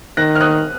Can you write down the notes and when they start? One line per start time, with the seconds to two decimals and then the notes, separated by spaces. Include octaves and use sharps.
0.17 D#3 F#6 A#6
0.35 F6
0.41 D#6 F#6